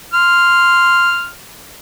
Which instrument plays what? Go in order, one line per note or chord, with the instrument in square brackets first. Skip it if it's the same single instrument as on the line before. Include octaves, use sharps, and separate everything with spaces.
[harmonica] C6 F6